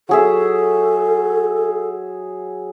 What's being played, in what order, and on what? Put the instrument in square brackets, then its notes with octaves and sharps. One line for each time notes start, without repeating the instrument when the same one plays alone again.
[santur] F#3 G#4 E5 [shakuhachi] A4